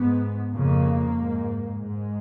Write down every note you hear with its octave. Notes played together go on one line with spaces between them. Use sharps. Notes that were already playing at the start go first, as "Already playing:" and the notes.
Already playing: G#2 B3
F2 C#3 A#3
G#2
G#2 G#3